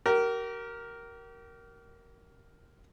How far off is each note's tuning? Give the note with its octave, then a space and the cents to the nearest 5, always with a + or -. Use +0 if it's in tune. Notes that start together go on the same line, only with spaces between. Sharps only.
G4 -40 A#4 +0